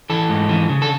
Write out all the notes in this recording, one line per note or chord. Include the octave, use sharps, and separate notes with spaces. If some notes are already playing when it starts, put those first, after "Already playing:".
E3 A4
G#2
E3
C#3
A4